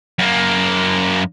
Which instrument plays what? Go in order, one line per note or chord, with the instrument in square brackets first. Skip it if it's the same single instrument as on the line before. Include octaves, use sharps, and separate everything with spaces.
[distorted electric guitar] F#2 A#3